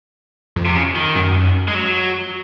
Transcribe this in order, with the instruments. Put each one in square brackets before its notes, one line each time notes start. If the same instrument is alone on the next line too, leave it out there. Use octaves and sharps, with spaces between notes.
[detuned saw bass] F2
[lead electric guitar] C3
C#3
D#3
[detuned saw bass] F#2
[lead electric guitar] G#3
F#3